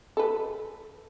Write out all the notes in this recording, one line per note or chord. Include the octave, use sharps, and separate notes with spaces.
A4 B4